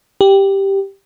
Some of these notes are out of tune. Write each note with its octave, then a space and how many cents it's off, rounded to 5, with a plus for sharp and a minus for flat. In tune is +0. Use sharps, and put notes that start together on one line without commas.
G4 +0